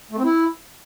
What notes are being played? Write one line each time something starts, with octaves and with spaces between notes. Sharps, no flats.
A3
C4
E4